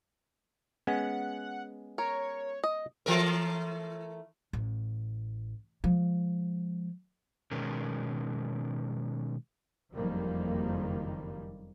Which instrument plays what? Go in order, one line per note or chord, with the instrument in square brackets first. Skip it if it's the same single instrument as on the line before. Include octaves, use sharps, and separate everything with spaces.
[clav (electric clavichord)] G#3 B3 C#4 [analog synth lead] F#5
[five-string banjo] A#4 [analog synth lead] C#5
[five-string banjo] D#5
[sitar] E3 A3 A#4
[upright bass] A1
F3 G#3
[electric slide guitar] B2 D#3 G#3 C#4 A#4
[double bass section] F#1 F2 D#3 F3 G3 A#3